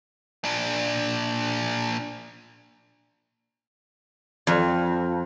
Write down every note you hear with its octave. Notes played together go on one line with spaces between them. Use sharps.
A#2 D4
F2